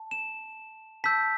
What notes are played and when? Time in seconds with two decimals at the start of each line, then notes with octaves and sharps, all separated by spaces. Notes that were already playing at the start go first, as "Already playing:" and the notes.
Already playing: A5
0.11 E7
1.04 A5 E6 G6 B6